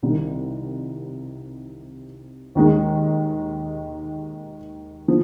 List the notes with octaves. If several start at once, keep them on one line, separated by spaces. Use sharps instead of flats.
C2 C3 D#3
D#2 D#3 G#3
F3